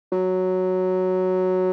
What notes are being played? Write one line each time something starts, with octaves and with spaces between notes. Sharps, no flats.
F#3